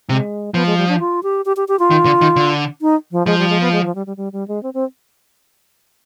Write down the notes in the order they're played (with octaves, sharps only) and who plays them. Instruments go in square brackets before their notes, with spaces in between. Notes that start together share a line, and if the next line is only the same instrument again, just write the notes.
[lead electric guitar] C3 [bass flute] G#3
[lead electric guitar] F3 [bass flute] B3
[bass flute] G#3
G3
D4
F4
G4
G4
G4
G4
F4
[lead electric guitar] D#3
D3
D#3
D3
[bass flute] D#4
F3
[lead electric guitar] F3 [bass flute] G#3
[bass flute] G3
G#3
B3
G#3
F3
G3
G3
G3
G3
G#3
C4
C4